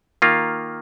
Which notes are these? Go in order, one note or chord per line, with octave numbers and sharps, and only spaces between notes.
D#3 A#3 F4